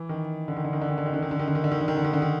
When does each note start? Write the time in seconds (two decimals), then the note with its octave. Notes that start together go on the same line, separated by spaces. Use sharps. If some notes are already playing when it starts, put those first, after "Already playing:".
Already playing: E3
0.09 D#3
0.48 D3
0.57 D#3
0.64 D3
0.73 D#3
0.81 D3
0.90 D#3
0.98 D3
1.06 D#3
1.14 D3
1.22 D#3
1.31 D3
1.39 D#3
1.48 D3
1.55 D#3
1.64 D3
1.72 D#3
1.81 D3
1.88 D#3
1.97 D3
2.04 D#3
2.13 D3
2.22 D#3